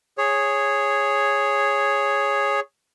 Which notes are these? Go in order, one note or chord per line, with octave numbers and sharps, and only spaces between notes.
G#4 C#5